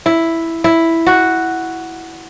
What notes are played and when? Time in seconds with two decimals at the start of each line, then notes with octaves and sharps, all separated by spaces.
0.06 E4
0.64 E4
1.07 F#4